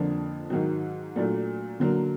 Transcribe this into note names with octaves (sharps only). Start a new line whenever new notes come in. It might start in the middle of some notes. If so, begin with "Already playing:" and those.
Already playing: F2 D3 F3 A#3 D4
G#2 D#3 F#3
A#2 F#3 A3 D4
D3 F#3 A#3